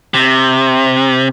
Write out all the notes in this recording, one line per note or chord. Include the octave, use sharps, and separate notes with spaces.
C3